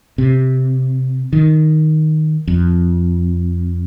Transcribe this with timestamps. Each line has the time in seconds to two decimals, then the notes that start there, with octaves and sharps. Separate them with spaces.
0.18 C3
1.33 D#3
2.48 F2